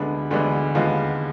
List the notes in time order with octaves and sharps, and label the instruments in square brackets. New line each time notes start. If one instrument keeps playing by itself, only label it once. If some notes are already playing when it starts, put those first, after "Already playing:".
Already playing: [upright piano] D2 D3 G#3 B3 D4
D2 D3 G#3 B3 D4
D#2 D3 G#3 B3 F4